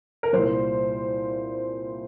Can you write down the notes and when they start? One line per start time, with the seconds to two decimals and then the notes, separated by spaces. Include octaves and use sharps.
0.23 A#4
0.33 C2 A#2 G3 C5